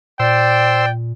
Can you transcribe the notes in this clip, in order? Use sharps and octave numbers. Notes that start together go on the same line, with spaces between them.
A#2 C5 D5 G5 E6